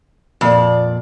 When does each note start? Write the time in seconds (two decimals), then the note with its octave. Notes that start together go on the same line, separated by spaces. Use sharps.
0.41 F2 A#2 D5